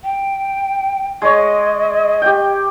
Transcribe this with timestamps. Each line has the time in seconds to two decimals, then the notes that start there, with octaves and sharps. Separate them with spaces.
0.04 G5
1.22 G#3 C#5 D#5
2.22 G4 G5